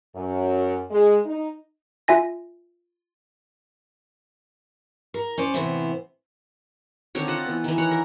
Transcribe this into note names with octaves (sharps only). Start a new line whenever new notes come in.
F#2
G#3
D#4
F4 E5 G#5 A#6
A#4
C#4 C5 D5
A2 C3 E3 B3 C5
D3 D#3 C4 C#5
F4 D#5 F#5 A5
E3 B3
D#3 E3
C#5 F#5 A#5
A#4